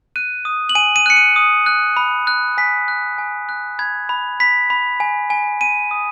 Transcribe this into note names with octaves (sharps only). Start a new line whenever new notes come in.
F#6 D#7
D#6
F#7
G#5 D#7
D#7
F#6 C#7
D#7
D#6
F#6
B5
F#6
G#5 B6
F#6
G#5
F#6
B5 G#6
B5
B5 B6
B5
G#5
G#5
G#5 D#7
D#6